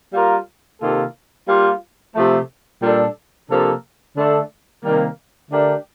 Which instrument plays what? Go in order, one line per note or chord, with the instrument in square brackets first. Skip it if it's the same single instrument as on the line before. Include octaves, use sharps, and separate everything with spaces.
[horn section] G3 A#3 F4 A#4
C3 D#3 A#3 F4 A4
G3 A#3 F4
C3 F3 A3
A#2 G3 D4 A4
C3 F3 A#3 D4 A4
D3 A3 D4 A4
C3 D#3 G3 A#3
D3 A3 D4 G4 A#4